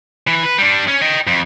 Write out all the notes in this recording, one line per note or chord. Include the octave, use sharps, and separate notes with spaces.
E3
B4
G3 D4
C#4
D#5 G5
F2